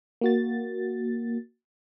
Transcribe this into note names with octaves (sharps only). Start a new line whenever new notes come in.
A#3 F#4 A6